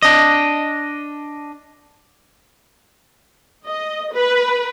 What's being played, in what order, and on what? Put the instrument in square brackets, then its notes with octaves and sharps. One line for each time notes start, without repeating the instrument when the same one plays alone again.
[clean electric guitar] D4 D#5
[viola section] D#5
B4